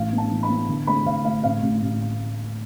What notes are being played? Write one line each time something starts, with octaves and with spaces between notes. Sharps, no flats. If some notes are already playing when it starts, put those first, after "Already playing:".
Already playing: A1 E3 F5
B3
A5
E3
B5
B3
D3
A3 B5
D3 F5
A3 F5
A1 F5
A1
A1